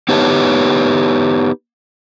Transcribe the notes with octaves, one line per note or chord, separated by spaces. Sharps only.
B3 D#4 G4 B4 C#5 A5